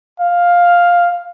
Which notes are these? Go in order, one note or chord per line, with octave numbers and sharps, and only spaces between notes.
F5